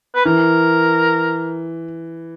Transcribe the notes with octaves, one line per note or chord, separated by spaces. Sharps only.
B4
E3 A#4